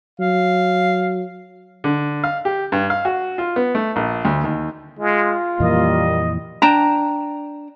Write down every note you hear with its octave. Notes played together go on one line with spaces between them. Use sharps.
F#3 F5
D3
F5
G4
G2
F5
F#4
F4
B3
A3
A#1
D2
D#2
G#3 F4
F2 A#2 E3 G3 A#3 D#5
D4 G5 A5 A#5